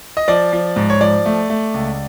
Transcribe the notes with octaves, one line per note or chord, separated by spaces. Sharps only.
D#5
F3 D5
F3
G#2
C#5
F3 D5
A3
A3
C#2